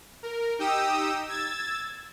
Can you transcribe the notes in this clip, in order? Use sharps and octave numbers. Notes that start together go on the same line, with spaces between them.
A#4
D#4 G4 G5 D#6 E6
E6 G#6 A6